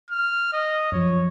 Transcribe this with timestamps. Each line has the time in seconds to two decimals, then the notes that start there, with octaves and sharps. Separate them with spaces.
0.10 F6
0.53 D#5
0.92 F#2 F3 C#5